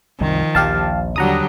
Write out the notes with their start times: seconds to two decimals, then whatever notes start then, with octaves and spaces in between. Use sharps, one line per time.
0.21 C2 F#2 D#3 F3
0.55 A#1 D#2 G4 F5 A5
1.16 D#2 D3 F#3 G3 F#5 A#5 D#6